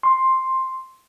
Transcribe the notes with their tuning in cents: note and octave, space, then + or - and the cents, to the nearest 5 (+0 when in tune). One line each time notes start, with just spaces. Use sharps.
C6 +5